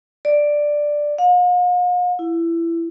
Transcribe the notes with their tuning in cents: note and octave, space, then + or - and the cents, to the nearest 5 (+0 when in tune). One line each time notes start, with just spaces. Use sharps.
D5 +5
F5 +45
E4 +20